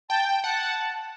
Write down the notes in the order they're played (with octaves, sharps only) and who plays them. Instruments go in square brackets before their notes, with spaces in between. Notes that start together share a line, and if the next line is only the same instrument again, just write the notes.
[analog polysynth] G5 [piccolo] A5
[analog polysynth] F#5 [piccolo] A5